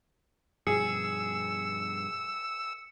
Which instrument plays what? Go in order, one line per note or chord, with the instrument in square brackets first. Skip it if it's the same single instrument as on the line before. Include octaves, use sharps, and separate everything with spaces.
[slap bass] G2 B2 F3 [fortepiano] G#4 [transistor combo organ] E6 [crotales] C#7